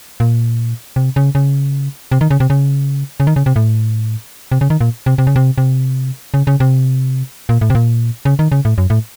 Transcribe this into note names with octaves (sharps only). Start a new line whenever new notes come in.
A#2
C3
C#3
C#3
C3
D#3
C#3
C3
C#3
C#3
D#3
C#3
C3
A2
C3
C#3
D#3
A#2
C3
C3
C#3
C3
C3
C#3
C#3
C3
A#2
A2
C3
A#2
C#3
D#3
C#3
A2
F#2
A2